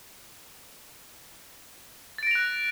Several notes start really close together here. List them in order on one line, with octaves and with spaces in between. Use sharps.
A6 D7 A#6 F7 F#6